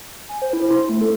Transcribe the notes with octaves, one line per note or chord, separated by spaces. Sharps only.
G#5
C5
E4
C6
A3
A4